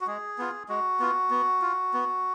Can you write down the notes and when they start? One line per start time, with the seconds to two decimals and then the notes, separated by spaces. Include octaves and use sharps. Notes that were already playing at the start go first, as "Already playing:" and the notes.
0.01 F#4
0.07 G#3 G#4
0.38 B3 F4
0.69 G#3 F#4
1.00 B3 F4
1.31 B3
1.62 F4
1.94 B3